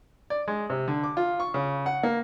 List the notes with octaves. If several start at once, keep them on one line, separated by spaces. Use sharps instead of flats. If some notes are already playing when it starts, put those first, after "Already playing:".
D5
G#3
C3
D3
D6
F4
C#6
C#3
F#5
A#3